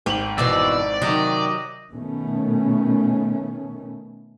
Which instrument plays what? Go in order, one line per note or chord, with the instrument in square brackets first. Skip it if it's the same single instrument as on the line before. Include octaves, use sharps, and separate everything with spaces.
[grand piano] G#1 F#7 [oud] G4
[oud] F2 B2 E3 [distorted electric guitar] D5 [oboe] E6
[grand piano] C3 D#3 [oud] F#3 [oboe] D#5
[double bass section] B2 D#3 A3 C#4